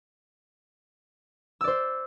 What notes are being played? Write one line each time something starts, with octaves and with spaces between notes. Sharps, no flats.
C5 D5 E6